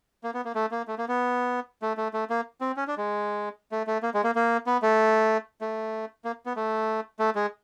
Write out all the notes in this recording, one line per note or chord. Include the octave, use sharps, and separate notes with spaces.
A#3
B3
A#3
A3
A#3
A3
A#3
B3
A3
A3
A3
A#3
C4
C#4
D4
G#3
A3
A3
A#3
G#3
A#3
A#3
B3
A3
A3
A#3
B3
A3
A3
G#3